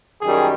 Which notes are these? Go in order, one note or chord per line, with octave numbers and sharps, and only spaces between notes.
F#2 D#3 G3 G#4